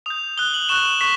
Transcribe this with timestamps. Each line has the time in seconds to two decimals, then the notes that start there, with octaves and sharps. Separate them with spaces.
0.06 D#6 G6 F7
0.37 D#6 F#6 G7
0.54 F#7
0.69 C#6 F#6 E7
0.85 E7
1.01 C#6 B6